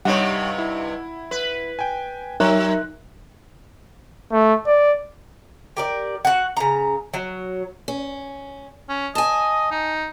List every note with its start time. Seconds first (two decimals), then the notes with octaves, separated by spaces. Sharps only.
0.05 G2 C3 G3 D#4 C#5 F#5
0.58 E4
1.31 B4
1.79 G5 G#5
2.40 F#3 D#4 A#4 C#5 E5 A#5 F#6
4.32 A3
4.67 D5
5.77 G4 A#4 D5
6.25 F#4 F#5
6.57 C#3 A#5
7.14 F#3
7.88 C#4
8.89 C#4
9.15 D#5 G#5 A5
9.71 D#4